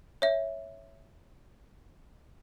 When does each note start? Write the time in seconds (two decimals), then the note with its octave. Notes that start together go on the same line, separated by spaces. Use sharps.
0.22 C#5 E5